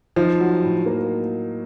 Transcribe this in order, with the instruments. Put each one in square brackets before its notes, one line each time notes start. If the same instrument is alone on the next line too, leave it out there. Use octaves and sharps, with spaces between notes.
[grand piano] F3 [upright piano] D#4
[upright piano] F#3
A2
A#3